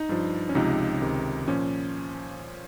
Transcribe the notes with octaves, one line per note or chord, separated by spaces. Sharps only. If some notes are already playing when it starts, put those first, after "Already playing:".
Already playing: D#4
G2 F3
C#4
C#2 C3 F3 D#4
C#2 C3 D#3
A#2 F3 C#4